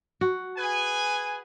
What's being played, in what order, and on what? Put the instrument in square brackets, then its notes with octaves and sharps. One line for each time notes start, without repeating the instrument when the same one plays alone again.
[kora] F#4
[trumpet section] G#4 B4 G#5